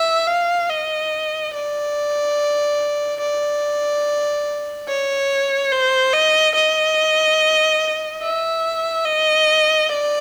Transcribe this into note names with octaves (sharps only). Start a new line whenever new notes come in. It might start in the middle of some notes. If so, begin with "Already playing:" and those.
Already playing: E5
F5
D#5
D5
D5
C#5
C5
D#5
D#5
E5
D#5
D5